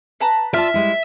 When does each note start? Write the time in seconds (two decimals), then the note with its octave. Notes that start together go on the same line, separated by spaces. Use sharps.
0.20 B4 A5 A#5
0.54 F4 D5 E5 A5 F6
0.74 G3 G#3 E4